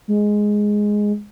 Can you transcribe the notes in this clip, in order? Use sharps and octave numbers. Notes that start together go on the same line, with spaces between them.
G#3